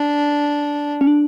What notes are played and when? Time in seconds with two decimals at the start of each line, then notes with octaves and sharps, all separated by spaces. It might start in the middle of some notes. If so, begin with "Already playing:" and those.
Already playing: D4
1.01 C#4
1.07 D4